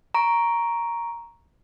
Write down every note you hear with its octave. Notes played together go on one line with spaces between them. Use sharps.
A#5 C#6 D7